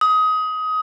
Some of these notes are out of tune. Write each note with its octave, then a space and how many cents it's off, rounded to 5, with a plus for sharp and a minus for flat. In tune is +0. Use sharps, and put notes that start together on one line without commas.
D#6 +20